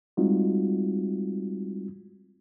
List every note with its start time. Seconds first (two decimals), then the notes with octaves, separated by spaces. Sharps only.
0.17 G3 G#3 C4 D#4 F4 F#4